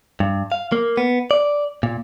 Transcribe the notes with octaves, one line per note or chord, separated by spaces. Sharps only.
G2
F5
A#3
B3
D5
A#2